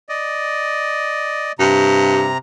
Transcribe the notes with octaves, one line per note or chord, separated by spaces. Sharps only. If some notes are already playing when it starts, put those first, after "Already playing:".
D5 D#5
G2 C3 A#5